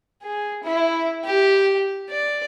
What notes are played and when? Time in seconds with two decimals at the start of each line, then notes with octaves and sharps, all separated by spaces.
0.23 G#4
0.64 E4
1.24 G4
2.10 D5